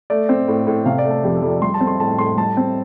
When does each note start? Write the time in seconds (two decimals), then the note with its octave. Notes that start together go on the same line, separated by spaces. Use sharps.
0.10 A3 D5
0.29 C4
0.48 A2
0.67 A2
0.85 C3 F5
0.98 D5
1.05 A3
1.10 A4
1.24 F2 G4
1.37 A4
1.42 F2
1.49 D5
1.62 G3 C6
1.74 A5
1.80 C4
1.87 C6
2.00 A2 A5
2.18 A2 C6
2.37 G3 A5
2.57 C4